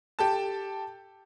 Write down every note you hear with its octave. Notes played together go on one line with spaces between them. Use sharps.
G4 A4 A5